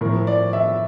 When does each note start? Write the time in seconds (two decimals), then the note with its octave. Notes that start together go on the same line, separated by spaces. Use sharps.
0.01 A2 F3 A#4
0.27 D5
0.53 E5